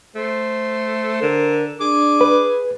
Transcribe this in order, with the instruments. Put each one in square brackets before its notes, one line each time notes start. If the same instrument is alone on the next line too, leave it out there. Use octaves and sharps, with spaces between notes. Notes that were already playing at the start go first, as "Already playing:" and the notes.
[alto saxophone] A3 [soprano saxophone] C5
[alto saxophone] D3 [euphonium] A#4
[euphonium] D4 [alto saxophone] G#4 [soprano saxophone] D6
[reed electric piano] B4